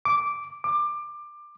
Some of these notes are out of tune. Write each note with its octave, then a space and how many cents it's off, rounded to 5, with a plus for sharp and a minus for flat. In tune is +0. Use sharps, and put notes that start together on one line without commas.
D6 -10
D6 +20